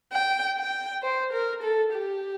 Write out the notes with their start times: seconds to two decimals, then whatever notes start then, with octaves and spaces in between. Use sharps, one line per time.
0.12 G5
0.58 G5
1.02 C5
1.33 A#4
1.63 A4
1.92 G4